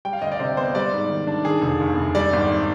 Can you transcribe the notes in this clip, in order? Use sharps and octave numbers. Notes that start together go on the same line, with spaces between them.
G3 G5
F5
D2 D#5
D5
C3 C5
B3 C5
G3 D5
G#2
D#3
D4
D#3 G#4
F1
D#2
F1
G3 D5
G#1